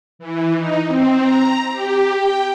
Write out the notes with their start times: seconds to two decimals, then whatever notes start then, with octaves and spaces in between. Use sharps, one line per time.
0.19 E3
0.57 D#4
0.88 C4
1.22 A#5
1.72 G4
2.16 G5